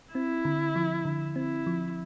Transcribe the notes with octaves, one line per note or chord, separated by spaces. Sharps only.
C4 E4
D3
F3
D3
C4 E4
F3